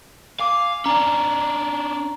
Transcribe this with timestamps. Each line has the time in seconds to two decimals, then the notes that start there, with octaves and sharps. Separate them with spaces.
0.40 F5 G#5 D6
0.86 C#4 D4 A#5